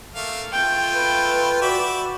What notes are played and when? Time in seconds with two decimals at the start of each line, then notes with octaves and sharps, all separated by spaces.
0.15 A3 A#3 F5
0.53 A3 F4 G5
0.94 B4
1.62 F#4 D5 E5 B5